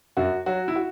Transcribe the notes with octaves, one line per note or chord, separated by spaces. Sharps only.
F#2 F#4
F#3 F#4
E4
F#4